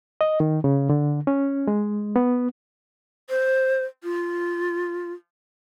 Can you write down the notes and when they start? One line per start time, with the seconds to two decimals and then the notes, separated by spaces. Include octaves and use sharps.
0.21 D#5
0.40 D#3
0.64 C#3
0.90 D3
1.27 C#4
1.68 G#3
2.16 B3
3.30 C5
4.04 F4